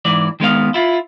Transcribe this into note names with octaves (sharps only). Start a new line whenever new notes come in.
G#2 E3 D5
D#3 G#3 B3 F5
E4 F4